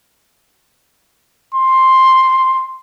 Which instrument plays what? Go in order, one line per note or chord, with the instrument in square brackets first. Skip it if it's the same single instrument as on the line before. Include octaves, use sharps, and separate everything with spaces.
[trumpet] C6